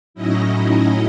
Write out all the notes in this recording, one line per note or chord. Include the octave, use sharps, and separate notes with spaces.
A2 F#3 C#4 D#4 E4 D#5